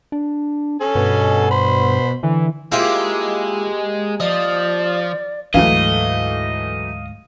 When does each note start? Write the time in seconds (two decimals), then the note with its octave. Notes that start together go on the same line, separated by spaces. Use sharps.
0.12 D4
0.81 C#4 A4 G#5
0.95 G2 B2
1.51 C5 B5
2.23 D3 E3
2.72 G#3 A#3 E4 F4 G4 C5
4.20 F3 D5 D#5
5.54 D2 G#2 E3 F#3 A3 D#5 F5